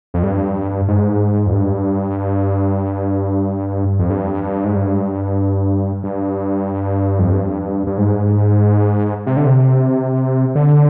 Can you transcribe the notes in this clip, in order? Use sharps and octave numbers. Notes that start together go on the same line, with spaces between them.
F2
G2
G#2
F2
G2
F2
G2
G#2
G2
G2
F2
G2
G2
G#2
C3
D3
C3
D3